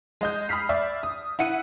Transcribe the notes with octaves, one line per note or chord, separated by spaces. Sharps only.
G#3 D#5 G6
B5 D#6 F6 B6 C7
D5 E5
D#6
E4 F#5 C#7 D#7